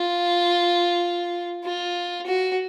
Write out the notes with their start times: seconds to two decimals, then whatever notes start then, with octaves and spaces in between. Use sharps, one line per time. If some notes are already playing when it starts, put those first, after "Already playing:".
Already playing: F4
1.64 F4
2.26 F#4